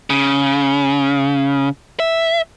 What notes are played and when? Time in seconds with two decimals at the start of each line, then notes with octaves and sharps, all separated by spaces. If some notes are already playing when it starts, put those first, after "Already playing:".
0.10 C#3
2.00 E5